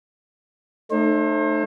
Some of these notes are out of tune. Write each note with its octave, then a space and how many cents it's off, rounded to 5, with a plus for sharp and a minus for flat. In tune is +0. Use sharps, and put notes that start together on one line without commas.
A3 +0 D#4 -35 C5 +40